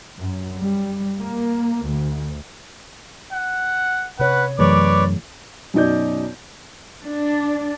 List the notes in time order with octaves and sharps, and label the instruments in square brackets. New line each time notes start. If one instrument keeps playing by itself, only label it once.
[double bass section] F#2
G3
A#3
D2
[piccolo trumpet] F#5
[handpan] C3 C#5 [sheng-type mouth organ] B4 [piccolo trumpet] F#5
[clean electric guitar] F#2 [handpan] E3 A3 G#4 [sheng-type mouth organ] B4 C#5 D5 [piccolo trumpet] D6
[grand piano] F#2 B2 D#4 D5 G6
[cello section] D4